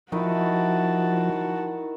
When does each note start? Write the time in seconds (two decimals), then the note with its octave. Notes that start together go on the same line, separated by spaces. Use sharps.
0.12 D#3 F3 D#4 E4 F#4 A5